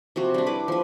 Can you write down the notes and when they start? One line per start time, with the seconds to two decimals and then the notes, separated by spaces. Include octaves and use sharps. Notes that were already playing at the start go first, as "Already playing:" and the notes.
0.16 C3 F3 F#4
0.34 G3 D4
0.46 E4 B4 D6
0.68 F3 B4